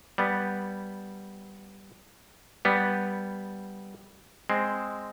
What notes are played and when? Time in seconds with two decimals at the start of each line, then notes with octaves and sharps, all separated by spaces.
0.18 G3 B3
2.65 G3 B3
4.50 G#3 C4